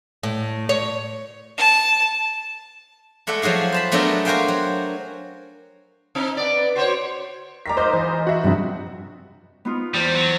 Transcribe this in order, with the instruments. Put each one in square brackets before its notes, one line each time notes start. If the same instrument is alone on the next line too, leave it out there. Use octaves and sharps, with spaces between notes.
[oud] A2
C#5
[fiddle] A5
[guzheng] G#3 A3 A4 D5 F#5
F3 F#3 F#4 G#4 F5
C5 A5 B5
F#3 A3 B3 D4 A4 A#4
F#4 A#4 C5 F5 G5 G#5
F#3
[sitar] C4 D#4
B3 D5
F#4 C5 C#5
[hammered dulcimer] D#3 G3 D5 [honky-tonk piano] A#5 B6
[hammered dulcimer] F#3 D#4 F4 [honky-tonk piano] C5 D#5 G6
[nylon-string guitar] E3 [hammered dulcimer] G#3 [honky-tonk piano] C5 D#5
[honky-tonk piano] F#4 E5
[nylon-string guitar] G2 C3 F3 [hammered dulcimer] B3 D#4
[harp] B3 D#4 F4
[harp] E2 C5 [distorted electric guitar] G3
[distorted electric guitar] F#3